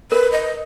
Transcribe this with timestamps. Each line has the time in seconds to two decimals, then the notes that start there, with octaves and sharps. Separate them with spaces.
0.12 A#4 B4
0.32 D#5